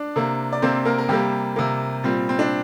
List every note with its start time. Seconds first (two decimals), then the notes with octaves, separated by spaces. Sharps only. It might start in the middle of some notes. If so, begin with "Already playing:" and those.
Already playing: D4 D5
0.16 C3 A#3
0.53 D5
0.62 C3 A#3 C4 C5
0.85 A#3 A#4
0.98 A#4
1.09 C3 G3 A#3 G4
1.56 C3 A#3
2.04 A#2 G3 C4
2.29 C4
2.39 D4